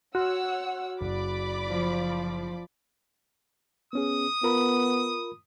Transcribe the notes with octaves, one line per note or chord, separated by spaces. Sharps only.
F#4 C#5 F#5 C6 E6 F6
F#1 D5 B5 D6
F3
B3 C#4 G#4 D#6
B3 F4 A#4 B5